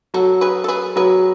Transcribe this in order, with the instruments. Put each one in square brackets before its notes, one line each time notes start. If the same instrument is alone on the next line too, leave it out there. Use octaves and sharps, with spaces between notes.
[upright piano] F#3 [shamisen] F#4 A4
[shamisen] G#4 B4
A4
G#4 B4
[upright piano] F#3 [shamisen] G#4 B4